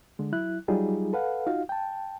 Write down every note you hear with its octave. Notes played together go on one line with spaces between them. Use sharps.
D3 G#3
F#3 E4 F#6
F#3 G3 D#4 F4 G#4
A4 B4 F5 F#5
D#4 F4 F#4 F5
G5 A5